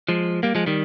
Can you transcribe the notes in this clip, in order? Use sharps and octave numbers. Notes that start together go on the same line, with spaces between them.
F3 G#3
G3 A#3
F3 G#3
D#3 G3